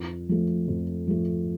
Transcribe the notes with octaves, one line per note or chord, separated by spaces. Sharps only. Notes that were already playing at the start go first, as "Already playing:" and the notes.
Already playing: F2
F3 A3
F2
F3 A3